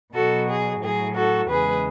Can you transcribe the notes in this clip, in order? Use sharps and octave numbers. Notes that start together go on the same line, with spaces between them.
B2 F#3 F#4 A4
G#4
A2 F#3 G#4
F#4 A4
E2 C#3 G#3 G#4 B4